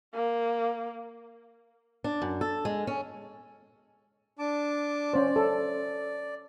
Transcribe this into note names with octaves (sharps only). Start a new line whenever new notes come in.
A#3
D4
F#2
A4
G#3
C#4
D4 A5 D6
C#4 C5 D5
A4